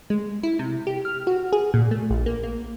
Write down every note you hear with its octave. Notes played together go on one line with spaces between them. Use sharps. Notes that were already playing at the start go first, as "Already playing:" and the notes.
G#3
E4
C3
G4
F6
F#4
G#4
A#2
A3
A#1
A#3
A#3